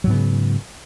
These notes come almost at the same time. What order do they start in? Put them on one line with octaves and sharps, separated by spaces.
F#3 G#2 B3 C#3